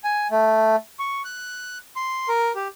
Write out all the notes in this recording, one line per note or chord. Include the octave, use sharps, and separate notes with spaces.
G#5
A3
C#6
F#6
C6
A#4
G4